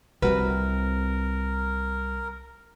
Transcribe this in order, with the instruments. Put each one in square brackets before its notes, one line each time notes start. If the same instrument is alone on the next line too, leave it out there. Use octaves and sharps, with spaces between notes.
[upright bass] C2 [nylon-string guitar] C4 F#4 B4 [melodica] A#4